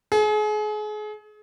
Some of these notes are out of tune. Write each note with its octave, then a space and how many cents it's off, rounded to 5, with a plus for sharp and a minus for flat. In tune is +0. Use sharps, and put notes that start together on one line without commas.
G#4 +35